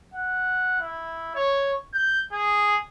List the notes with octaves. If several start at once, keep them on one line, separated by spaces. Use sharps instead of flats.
F#5
E4
C#5
G6
G#4